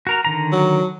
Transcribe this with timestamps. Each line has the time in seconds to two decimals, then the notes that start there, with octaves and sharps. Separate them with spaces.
0.07 F#4 A#4 A#5
0.25 D3 D#3 A#5
0.52 F#3